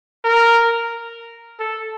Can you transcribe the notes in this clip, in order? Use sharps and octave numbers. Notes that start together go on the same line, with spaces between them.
A#4
A4